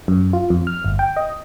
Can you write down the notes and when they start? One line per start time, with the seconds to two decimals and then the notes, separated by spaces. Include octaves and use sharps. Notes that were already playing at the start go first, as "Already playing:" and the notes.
0.08 F#2
0.33 F4
0.50 F2
0.67 F6
0.84 G1
0.99 G5
1.17 D#5